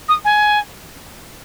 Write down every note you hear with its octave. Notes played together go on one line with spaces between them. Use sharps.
D#6
G#5